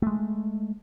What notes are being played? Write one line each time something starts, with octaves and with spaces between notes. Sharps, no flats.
G#3 A3